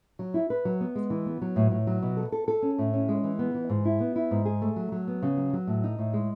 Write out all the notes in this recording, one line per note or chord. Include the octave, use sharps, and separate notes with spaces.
F#3
E4
B4
F#3
B3
G#3
E3
B3
F#3
A2
A2
F#3
B2
A4
A4
A4
C#4
A2
C#4
G#3
E3
B3
E3
G#2
E4
B3
E4
G#2
G#4
A3
F#3
F#3
B3
C#3
F#3
F#3
A2
D#4
A2
G#3